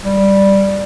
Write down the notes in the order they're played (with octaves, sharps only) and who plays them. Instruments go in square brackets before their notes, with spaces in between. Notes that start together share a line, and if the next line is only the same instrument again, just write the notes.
[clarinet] G3